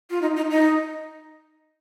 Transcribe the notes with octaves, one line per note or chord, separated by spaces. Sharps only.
F4
D#4
D#4
D#4